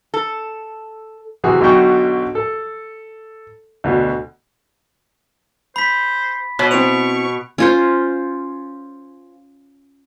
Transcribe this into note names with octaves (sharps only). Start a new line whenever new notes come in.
A4
C3 E3 F#4 G#4
B1 B2 D3 F#4 G5 C#6
A4
D2 B2
C5 B5 B6
B2 C#5
C4 E4 C5 C#6 D7 F7
C#4 F4 C5